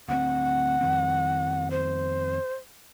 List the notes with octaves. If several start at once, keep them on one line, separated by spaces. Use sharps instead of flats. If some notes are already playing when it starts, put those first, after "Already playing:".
D2 B3 C4 F#5
F2 D#3 C4
C5